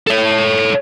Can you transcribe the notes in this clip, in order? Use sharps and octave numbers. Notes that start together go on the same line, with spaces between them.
A4 C#5